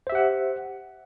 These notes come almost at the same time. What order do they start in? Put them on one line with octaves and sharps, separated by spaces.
C5 E5 G4 F#5